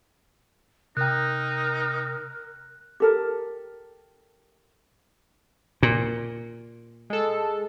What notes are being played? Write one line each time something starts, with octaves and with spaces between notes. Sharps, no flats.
C3 D#4 A#4 G5 F#6
G4 A4 A#4
A#2
G#3 A4